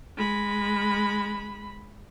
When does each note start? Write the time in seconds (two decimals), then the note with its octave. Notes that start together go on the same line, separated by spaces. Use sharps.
0.17 G#3 B5